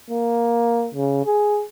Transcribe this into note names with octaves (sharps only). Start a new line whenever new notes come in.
A#3
C#3
G#4